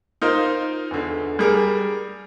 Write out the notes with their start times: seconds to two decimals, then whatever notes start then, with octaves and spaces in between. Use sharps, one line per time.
0.22 D#4 F4 A#4 C5
0.91 E2 D3
1.39 G3 G#4 A#4